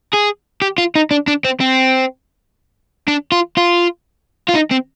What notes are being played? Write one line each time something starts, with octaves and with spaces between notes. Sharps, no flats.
G#4
G4
F4
D#4
D4
D4
C4
C4
D4
F4
F4
F4
D#4
C4